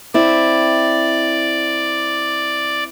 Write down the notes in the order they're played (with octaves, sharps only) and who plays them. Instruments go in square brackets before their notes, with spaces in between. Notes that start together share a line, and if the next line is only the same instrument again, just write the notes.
[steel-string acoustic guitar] C4 E4 [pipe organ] D5